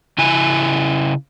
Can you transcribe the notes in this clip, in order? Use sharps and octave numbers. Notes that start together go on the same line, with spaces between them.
C#3 E4 G#5